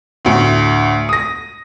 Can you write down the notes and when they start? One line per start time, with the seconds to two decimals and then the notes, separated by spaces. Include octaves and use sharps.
0.25 D2 A2
1.09 D#6 A#6